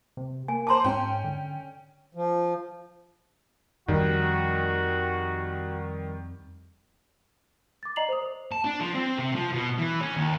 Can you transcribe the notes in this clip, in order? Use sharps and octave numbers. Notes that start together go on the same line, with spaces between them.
C3
A#3 G#5
C5 A5 A#5 C6 D6
G#2 C#4 G5
D3
F3
F2 D#3 G3 F#4
D6 A6
D5 D#5 A#5 C7 F7 F#7
C5 D#6
C5
A5
D4
F3
C4
C3
F3
B2
E3
C#4
D#2